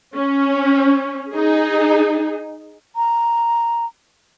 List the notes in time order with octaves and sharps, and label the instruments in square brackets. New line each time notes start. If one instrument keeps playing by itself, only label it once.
[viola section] C#4
D#4 G#4
[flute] A#5